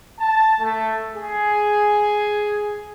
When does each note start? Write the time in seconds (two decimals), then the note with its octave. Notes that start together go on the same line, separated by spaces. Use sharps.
0.19 A5
0.60 A3
1.15 G#4